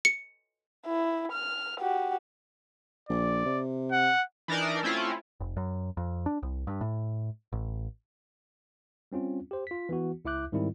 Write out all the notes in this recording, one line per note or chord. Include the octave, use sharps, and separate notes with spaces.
C#7
E4
F6
F#4 G4
A#1 D5
C3
F#5
E3 D4 D#4 A#4 D5
A3 C4 C#4 E4 F4
F1
F#2
F2
D4
C2
G2
A2
A1
G3 C4 C#4 F4
G4 C5
F4 B6
E3 B3 F#4
C#2 E4 E5 D6 F#6 G6
G#2 D#3 G3 C4 E4